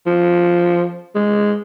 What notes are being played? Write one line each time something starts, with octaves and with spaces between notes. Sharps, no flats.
F3
G#3